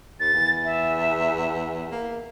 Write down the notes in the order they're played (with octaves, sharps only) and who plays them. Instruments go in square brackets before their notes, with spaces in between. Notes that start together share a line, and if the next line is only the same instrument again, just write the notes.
[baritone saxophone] D#2 [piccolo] A6
[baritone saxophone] E2
[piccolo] E5
[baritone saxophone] A#3